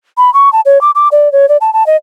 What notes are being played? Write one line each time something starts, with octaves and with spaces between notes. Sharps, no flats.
B5
C#6
A5
C#5
D6
D6
D5
C#5
D5
A5
A5
D#5